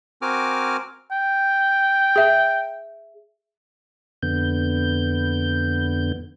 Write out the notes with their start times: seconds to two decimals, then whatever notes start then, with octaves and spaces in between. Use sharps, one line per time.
0.22 C4 F#4 A#4 G#5 D6 F6
1.11 G5
2.16 G#4 E5
4.23 F2 D3 B3 G6